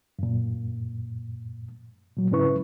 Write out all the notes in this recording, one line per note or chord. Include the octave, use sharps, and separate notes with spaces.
F#2 A#2
A#2 F#3
G#2 C#3 C#4 E4 B4 C#6